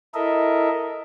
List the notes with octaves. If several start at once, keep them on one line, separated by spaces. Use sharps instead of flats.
E4 A4 A#4 D#5 E5